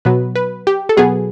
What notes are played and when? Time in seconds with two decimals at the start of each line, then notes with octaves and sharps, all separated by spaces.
0.05 B2 F#3 B3 B4
0.36 B4
0.67 G4
0.89 A4
0.97 B2 F#3 B3 G#4